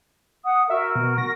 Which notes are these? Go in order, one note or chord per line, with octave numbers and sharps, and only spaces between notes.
F#5 D#6
F#4 A#4 E5
B2
A#6